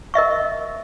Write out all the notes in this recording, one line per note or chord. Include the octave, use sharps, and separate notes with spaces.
A#4 D#5 E5 C#6